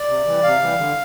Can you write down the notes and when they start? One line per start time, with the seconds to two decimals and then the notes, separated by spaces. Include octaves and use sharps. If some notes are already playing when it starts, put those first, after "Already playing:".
Already playing: D5
0.08 C3
0.26 E3 G3
0.43 C3 F5
0.61 E3 G3
0.78 D3